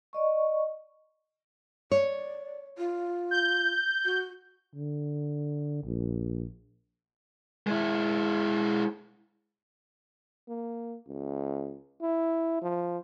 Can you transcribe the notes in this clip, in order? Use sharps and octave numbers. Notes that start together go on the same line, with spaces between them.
D5 D#5 C#6
C#5 D5
F4
G6
F#4
D3
A#1
G#3 E4
A#3
C#2
E4
F3